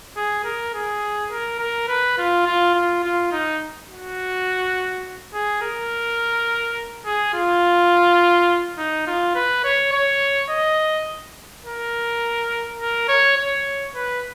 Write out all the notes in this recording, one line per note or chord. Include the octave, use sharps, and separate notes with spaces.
G#4
A#4
G#4
A#4
A#4
B4
F4
F4
F4
F4
D#4
F#4
G#4
A#4
G#4
F4
D#4
F4
B4
C#5
C#5
D#5
A#4
A#4
C#5
C#5
B4